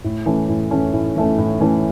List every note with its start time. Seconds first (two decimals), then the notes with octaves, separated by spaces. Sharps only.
0.04 A2
0.26 E3 A3 C#4
0.49 A2
0.71 E3 A3 C#4
0.93 A2
1.16 E3 A3 C#4
1.38 A2
1.61 E3 A3 C#4